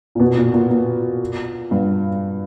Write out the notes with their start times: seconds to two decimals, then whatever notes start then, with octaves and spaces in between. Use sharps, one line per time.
0.15 A#2
0.20 B2
0.37 A#2
0.54 A#2
0.70 A#2
1.71 G2